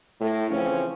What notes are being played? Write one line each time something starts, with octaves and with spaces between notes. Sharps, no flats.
A2
C#3 E3 F3 C4 C#4